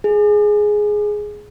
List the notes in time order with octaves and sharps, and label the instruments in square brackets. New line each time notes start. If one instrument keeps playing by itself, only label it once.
[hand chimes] G#4